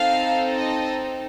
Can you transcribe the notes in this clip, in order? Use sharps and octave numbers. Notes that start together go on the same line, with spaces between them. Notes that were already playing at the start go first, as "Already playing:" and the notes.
Already playing: C4 D#4 A4 F5
D#5